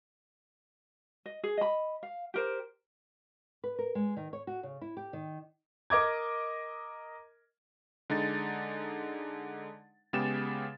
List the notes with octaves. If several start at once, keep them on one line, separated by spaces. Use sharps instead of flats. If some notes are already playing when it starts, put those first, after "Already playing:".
D#5
G#4
D#5 B5
F5
G4 A#4 C5
B4
A#4
G#3
D#3
C#5
F#4
C#3
E4
G4
D#3
A#4 D#5 D6 G#6
D3 G#3 D#4 A6
C#3 G#3 B3 G4 A6 E7